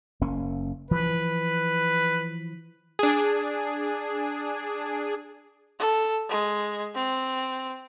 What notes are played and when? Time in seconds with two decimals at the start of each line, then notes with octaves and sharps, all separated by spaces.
0.21 F#1 A#3 C#4
0.91 E3 F3 B4
2.99 D4 G#4
5.80 A4
6.30 G#3
6.95 C4